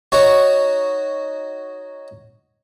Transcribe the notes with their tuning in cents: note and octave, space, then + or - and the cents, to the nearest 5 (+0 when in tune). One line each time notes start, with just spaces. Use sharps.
D#4 +0 F#4 +0 C#5 +0